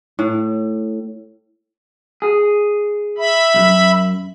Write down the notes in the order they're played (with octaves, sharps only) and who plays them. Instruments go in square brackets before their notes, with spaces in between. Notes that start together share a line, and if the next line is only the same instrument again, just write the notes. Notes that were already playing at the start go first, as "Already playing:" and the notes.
[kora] A2
[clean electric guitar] G#4
[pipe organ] E5 B5
[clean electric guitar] B1 F#2